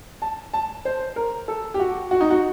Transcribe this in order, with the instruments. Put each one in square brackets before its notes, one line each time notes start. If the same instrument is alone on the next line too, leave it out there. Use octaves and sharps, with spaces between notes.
[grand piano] A5
A5
C5
A#4
A4
G4
F#4
F#4
D#4
F#4